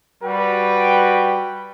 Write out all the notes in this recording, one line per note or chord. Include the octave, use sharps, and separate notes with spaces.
G3 F#4 B4 G5